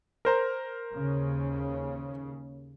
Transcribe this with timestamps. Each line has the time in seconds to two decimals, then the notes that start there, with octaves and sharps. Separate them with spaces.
0.25 A#4 C5 A#5
0.93 D#2 C#3